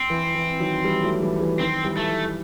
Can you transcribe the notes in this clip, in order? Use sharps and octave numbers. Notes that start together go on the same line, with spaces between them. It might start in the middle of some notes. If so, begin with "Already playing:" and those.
Already playing: C4
E3
E3
D#3 F#3
E3 G3
F#3 A3
E3 G3
E3 G3
D#3 F#3 C4
E3 G3
A3
E3